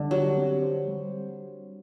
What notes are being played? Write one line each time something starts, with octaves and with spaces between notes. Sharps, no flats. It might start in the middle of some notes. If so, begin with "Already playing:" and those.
Already playing: D3 G3
F#3 G4
C4
C5
G3